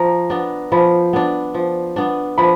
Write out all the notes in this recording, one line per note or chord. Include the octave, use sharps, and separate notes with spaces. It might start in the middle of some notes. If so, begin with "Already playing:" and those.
Already playing: F3 A#5
B3 D4
F3 B5
B3 D4
F3
B3 D4
F3 B5